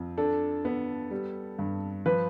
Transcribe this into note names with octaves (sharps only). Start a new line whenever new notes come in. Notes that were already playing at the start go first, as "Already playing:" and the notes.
Already playing: F2
D4 A4
B3
G3
G2
F3 B4